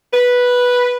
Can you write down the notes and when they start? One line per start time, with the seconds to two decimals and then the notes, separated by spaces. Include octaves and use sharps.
0.14 B4